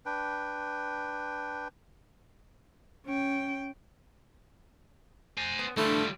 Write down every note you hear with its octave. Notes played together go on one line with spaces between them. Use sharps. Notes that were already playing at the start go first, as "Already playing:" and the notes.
D4 B4 G5
C#4 G5
C5 G#5
B3
D3 E3 G3 A3 D4 F4